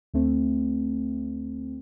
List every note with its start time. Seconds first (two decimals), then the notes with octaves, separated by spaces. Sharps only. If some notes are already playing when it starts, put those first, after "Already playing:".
0.14 D2 A3 C4